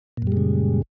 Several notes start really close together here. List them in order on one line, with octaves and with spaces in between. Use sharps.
A#2 F#2 G3 G#3 C#3